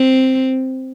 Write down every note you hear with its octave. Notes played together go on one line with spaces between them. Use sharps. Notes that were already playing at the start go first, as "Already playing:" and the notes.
Already playing: C4